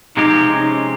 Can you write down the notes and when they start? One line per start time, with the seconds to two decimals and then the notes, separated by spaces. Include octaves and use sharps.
0.17 C3 F3 G#3 C4 D#4 G4
0.53 C#4